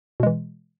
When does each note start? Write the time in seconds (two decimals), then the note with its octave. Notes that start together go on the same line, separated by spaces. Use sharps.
0.20 B2
0.23 G#3
0.27 E3